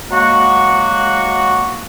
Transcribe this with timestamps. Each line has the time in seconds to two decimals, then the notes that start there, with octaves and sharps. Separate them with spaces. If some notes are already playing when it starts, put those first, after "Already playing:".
0.10 F#3 G#3 A#3 F#4